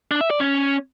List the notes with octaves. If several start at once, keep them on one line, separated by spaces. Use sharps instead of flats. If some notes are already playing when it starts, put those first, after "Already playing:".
D4
E5
D5
C#4